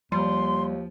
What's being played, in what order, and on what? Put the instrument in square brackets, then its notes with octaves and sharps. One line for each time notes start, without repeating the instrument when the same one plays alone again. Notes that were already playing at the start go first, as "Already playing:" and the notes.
[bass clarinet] D#2 [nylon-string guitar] F3 [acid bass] G3 [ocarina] C6